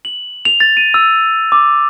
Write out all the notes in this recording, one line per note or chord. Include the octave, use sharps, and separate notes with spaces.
F#7
F7
A6
D#7
E6
D6